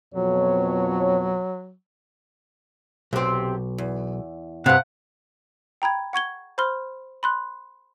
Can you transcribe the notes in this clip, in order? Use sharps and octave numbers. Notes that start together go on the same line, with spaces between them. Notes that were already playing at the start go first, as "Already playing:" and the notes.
F2 B2 F#3 C#5
B1 C3 C4
E2
G2 C3 F5 F#5
G5 A#5 B5 G#6
F#5 C#6 G#6 G7
C5 B5 C6 F6 G7
B5 C6 F#6